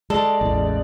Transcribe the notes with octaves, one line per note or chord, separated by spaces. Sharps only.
G#3 A4 D5
A1 E2